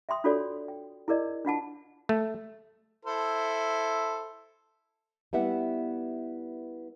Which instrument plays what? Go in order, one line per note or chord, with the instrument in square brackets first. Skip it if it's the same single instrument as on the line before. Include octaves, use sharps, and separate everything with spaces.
[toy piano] E5 G5 C6 D#6
D4 F4 F#4 A4 C#5 D5
G5
E4 G#4 A#4 D5 D#5
D4 F4 F#5 A5
[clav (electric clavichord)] A3
[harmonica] E4 A4 C5
[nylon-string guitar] G3 B3 E4 E5 F#5